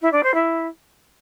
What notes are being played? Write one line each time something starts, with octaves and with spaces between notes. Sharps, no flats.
E4
D4
C5
E4